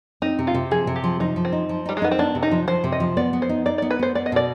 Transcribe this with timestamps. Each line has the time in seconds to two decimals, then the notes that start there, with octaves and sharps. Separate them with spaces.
0.22 C4 D#4
0.39 C3
0.47 F4
0.54 C3
0.71 F3 G#4
0.87 C3
0.96 G4
1.04 F3
1.20 F3 D#4
1.36 F3
1.45 C4
1.53 D#4
1.69 F3
1.86 G3 D#4
1.97 G#3
2.02 B3 D#4
2.11 C4
2.19 B3 D4
2.35 C3
2.43 D#4
2.51 F3
2.67 F3 C5
2.84 C3
2.92 D#5
3.00 F3
3.17 B3 D5
3.33 B3
3.42 C5
3.49 D#4
3.66 D#4 D5
3.78 D5
3.82 B3
3.90 B4
3.99 B3 C5
4.15 B3 D5
4.26 D#5
4.32 B2 D5